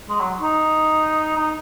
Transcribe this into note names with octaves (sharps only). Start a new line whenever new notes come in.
G#3
F#3
D#4
D#4